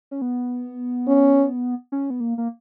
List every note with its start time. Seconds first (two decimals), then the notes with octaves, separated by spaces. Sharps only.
0.11 C#4
0.22 B3
1.07 C#4
1.92 C#4
2.10 B3
2.20 A#3
2.38 A#3